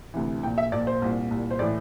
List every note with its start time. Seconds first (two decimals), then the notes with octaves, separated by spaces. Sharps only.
0.14 D2 C3 E3
0.43 A#1 G5
0.46 A#2
0.58 E5
0.72 A#1 A#2 D5
0.87 C5
1.02 C2 A#2
1.31 C2 A#2
1.51 C5
1.59 A2 E3 D5